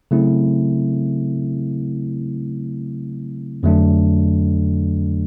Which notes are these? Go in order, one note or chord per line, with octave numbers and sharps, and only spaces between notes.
C#3 F#3 A3 C4 E4
F2 D3 F#3 A3 D4